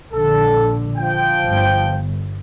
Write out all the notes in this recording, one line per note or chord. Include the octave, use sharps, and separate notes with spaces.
A#1 D3 A4
F3 G5
G1